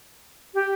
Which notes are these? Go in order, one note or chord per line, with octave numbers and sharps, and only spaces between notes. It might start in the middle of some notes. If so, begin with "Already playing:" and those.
G4